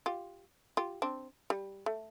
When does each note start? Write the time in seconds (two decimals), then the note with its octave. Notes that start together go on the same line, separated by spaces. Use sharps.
0.06 F4 G4
0.77 F4 G4
1.02 C4 D4
1.50 G3
1.86 A3